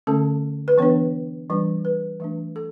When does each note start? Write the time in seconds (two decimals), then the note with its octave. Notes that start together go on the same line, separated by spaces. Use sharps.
0.07 D3 A3 C#4 A4
0.68 B4
0.78 E3 B3 D4 C#5
1.50 E3 G3 D4
1.85 B4
2.20 E3 A3 D4
2.56 A4